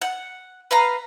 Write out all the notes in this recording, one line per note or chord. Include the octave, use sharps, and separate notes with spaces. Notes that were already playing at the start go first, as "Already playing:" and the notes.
F#5
B4 F5 A#5